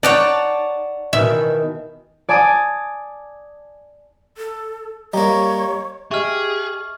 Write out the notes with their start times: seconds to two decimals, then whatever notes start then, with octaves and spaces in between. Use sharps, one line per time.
0.03 D#4 C#5 D5 F#5 A5
1.13 B2 D#3 E3 E5
2.29 D5 G#5 A5 D6 D#6
4.37 A4
5.14 G3 A#3 C#5 D#5 A#5
6.11 G4 G#4 D#5 E5 C#6 F6